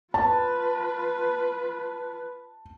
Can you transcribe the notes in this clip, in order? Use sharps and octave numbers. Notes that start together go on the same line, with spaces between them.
F4 B4 A5